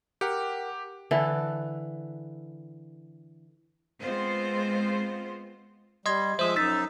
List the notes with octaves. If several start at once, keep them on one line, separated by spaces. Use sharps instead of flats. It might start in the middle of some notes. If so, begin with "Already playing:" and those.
G4 A#4 F#5 G5
D3 E3 A4
G#3 B3 C4 F4 C5
G3 D#5 C6 G#6
F3 G#3 C5 E5 D#6
F#2 D#4 E6 A6 B6